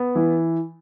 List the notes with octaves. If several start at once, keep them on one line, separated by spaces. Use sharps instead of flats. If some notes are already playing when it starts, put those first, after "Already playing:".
Already playing: B3
E3